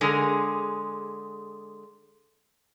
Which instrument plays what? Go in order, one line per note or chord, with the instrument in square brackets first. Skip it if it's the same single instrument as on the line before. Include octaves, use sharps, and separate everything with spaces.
[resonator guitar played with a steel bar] D3 G#3 G#4 A#4